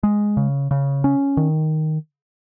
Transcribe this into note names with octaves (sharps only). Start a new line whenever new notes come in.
G#3
C#3
C#3
C#4
D#3